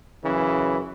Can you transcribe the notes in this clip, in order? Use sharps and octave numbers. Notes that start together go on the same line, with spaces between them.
F#2 C#3 E3